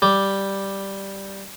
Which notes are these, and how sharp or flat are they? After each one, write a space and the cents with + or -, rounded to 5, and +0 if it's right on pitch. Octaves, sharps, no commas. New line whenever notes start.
G3 +0 D6 +0